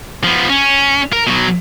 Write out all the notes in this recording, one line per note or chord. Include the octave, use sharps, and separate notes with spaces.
F3 B3
C#4
A#4
B2 F#3